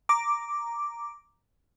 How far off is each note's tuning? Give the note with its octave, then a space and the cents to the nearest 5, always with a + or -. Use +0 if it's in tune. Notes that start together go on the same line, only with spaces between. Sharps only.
A#5 +0 D6 +0